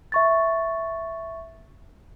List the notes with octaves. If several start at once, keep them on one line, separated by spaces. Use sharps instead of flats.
E5 C#6 A6